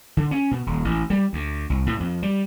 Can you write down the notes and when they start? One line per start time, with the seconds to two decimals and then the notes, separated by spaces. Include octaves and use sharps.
0.17 D3
0.31 C#4
0.51 B2
0.66 D#1
0.85 A1
1.10 G3
1.33 D2
1.70 C2
1.86 A2
2.00 F2
2.23 G3